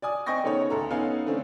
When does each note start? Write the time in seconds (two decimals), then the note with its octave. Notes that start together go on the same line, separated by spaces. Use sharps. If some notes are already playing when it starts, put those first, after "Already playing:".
0.02 D5 G#5 D#6
0.26 C4 D#5 G5 G#5 C#6 A#6
0.44 C#3 B3 D#4 A4 C#5
0.70 D2 A4 A#5
0.90 B3 C#4 D#4 A4 F5 G#5
1.26 D3 A3 C4 C#4